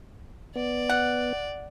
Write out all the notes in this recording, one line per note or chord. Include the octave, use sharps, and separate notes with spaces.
B3 D5
F#5